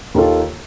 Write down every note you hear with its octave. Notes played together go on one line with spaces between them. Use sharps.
D#2 D#3 A#3 F4 A4